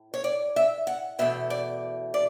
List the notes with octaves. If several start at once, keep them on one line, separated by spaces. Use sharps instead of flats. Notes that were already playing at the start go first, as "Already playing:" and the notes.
Already playing: A2
C#5
D5
E5
F#5
E2 B2 A3 E5
D5
D5